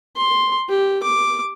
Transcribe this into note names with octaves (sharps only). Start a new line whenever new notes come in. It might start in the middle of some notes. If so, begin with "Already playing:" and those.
C6
G4
D6